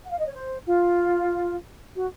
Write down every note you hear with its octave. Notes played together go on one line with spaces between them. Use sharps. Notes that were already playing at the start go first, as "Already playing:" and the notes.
F#5
F5
D#5
C#5
C5
F4
F#4